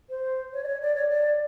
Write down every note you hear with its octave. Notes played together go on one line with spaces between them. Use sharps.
C5
C#5
D5
C#5
D5
C#5
D5